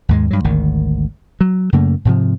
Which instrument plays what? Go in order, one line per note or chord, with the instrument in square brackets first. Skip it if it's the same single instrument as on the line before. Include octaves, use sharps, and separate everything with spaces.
[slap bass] D#2 G#2 G#3
G2 F#3
G#1 D2 D#3
F#3
F#2 C#3 A3 A#3
G#2 C3 F3